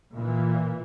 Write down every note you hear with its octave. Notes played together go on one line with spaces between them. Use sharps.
A#2 E3